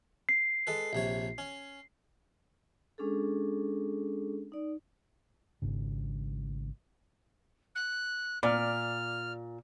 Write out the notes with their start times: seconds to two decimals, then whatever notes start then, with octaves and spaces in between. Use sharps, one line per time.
0.29 C7
0.67 G#3 A4 B4
0.93 A#1 C3 C#5
1.38 C#4
2.98 G#3 C#4 D4 G#4 A4
4.52 D#4 D5
5.62 G#1 G#2 C#3
7.75 F#6
8.43 A#2 D5 F6